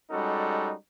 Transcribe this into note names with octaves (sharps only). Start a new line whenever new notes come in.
G3 G#3 C#4 D#4 F#4 A4